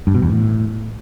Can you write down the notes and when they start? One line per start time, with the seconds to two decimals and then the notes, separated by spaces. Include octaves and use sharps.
0.07 G2
0.15 B2
0.22 E2
0.30 A2